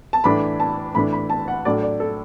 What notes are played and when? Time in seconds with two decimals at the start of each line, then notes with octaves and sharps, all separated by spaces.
0.13 A5
0.24 A2 E3 D4 B5
0.60 A5
0.94 A2 E3 D4 B5
1.12 B5
1.30 A5
1.48 F#5
1.65 A2 F#3 A3 D4 D5
1.83 D5
2.00 A4